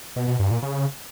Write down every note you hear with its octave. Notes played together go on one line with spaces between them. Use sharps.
B2
B2
G2
A#2
C#3